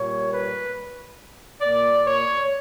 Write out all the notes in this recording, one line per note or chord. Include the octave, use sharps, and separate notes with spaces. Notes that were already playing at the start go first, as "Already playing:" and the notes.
Already playing: A#2 G3 A#3 C#5
B4
A#2 A#3 D5
C#5